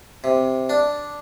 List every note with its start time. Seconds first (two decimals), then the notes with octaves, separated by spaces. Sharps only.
0.24 C3
0.69 D4